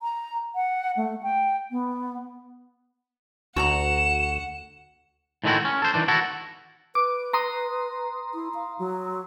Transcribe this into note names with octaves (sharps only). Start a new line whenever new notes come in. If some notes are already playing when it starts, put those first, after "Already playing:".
A#5
F#5
A3
G5
B3
D2 F#4 F#5 G#5 A#5 E7
A2 D#3 G#3 A3 E4 F#4
C#4
A4 C5
D#3 E3 D4
E4 F#4 A4
B4 D6
A#5 C6 D#6
E4
F5
F#3